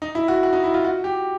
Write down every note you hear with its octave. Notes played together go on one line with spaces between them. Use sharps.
D#4
E4
F#4
F#4
D#4
E4
F4
F#4
G4